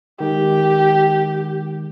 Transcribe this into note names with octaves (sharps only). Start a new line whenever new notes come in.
D#3 G#3 G4